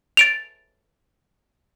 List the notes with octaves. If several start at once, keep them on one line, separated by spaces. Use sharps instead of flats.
A6 D7 F7